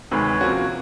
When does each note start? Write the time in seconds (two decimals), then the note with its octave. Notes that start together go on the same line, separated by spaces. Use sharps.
0.11 D2 C3 D#3 G#3 B4 C#5
0.41 C3 F3 A#3 C#4 F#4